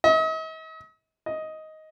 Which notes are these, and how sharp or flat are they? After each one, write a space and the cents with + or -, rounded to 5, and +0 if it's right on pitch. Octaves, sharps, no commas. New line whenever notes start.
D#5 +45
D#5 +10